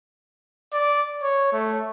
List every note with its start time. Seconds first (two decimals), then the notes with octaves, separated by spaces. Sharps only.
0.73 D5
1.22 C#5
1.53 A3